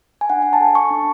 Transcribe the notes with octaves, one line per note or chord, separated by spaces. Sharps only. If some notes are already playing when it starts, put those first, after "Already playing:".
G#5
D4 F#5
G#5
A5
A4
C#6
D4